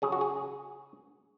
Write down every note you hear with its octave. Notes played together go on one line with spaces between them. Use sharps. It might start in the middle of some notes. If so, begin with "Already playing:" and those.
C#3 F#3 G#4
F#4
G#4